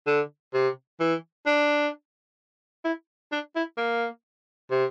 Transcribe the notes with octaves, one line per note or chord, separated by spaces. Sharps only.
D3
C3
E3
D4
E4
D4
E4
A#3
C3